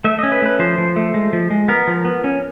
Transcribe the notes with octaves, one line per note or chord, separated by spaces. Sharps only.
A3 E5
D#5
C#4
B4
A3 B4
F3 C5
F3
A3
G#3
F3
G#3
B3 A#4
F3
B3
C#4